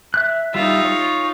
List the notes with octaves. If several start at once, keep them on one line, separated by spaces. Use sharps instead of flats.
E5 F#6
G3 D#4 F4 E5
C#5